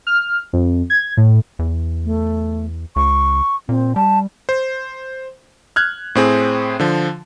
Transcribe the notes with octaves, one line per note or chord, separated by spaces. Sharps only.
F6
F2
G#6
A2
E2
A3
C#2 C#6
A#2 C4
G3 A5
C5
F6 F#6 G#6
A2 C4 G#4
D3 F3